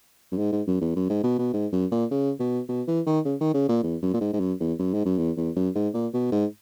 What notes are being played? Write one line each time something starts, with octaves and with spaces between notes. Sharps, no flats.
F#2
G#2
G#2
F#2
E2
F#2
G#2
B2
B2
G#2
F#2
A#2
C#3
B2
B2
E3
D#3
C#3
D#3
C#3
A#2
E2
F#2
A#2
G#2
G#2
F#2
E2
F#2
G#2
F#2
E2
E2
F#2
G#2
A#2
B2
G#2